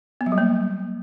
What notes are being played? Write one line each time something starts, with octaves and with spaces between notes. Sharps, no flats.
B3
F#3
G3
A#3